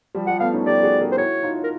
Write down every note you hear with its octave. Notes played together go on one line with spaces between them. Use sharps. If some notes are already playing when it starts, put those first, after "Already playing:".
F3 G3
F3 G3 F#5
A3 B3 F5
C#4 D#4
G4 A4 D5
G4
F#4 G#4
G#4 A#4
C5
E4 F#4 C#5
D#4 F4
A#4